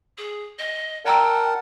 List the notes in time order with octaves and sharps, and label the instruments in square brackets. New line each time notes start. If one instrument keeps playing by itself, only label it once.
[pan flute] G#4
D#5
[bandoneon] A#4 F#5 A5 [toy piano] D5 A#5 E6 [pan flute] G5